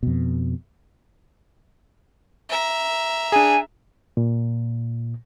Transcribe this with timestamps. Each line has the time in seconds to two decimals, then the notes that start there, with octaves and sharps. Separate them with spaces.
0.03 F2 B2
2.49 E5 A#5
3.32 D4 G#4 G#5
4.17 A#2